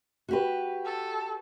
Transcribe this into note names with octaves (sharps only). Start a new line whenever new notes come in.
F#4 G4 B4
A4